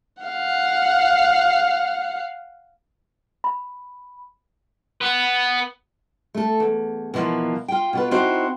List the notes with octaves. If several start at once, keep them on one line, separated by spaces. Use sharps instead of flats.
F5 F#5
B5
B3 B4
A3 A4
E2
B2 E3 F3 A#3
F4 G5
B2 F4 B4
C4 D#4 E4 F#4 C5